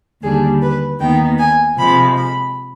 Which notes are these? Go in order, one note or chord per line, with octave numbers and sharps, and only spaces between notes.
D#2 D3 G3 D4 G#4
B4
D#2 D#3 B3 D#4 G5
G#5
C3 F3 G#3 B5
B5